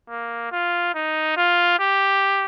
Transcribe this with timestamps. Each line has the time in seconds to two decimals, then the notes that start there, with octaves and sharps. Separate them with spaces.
0.09 A#3
0.52 F4
0.95 D#4
1.37 F4
1.79 G4